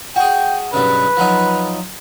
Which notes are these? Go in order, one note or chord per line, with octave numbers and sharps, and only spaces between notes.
F#4 G#4 G5
B1 G2 C#3 B4
F3 F#3 D#4